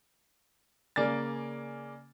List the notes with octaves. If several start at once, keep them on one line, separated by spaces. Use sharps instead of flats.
C#3 A#3 D5 G#5 A6